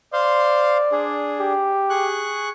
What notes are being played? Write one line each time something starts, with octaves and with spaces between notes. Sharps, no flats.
C5 D5 F5 C6
D4 G#4
G4
G#4 C#6 F#6